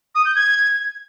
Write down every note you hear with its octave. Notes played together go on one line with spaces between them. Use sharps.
D#6
G6
G#6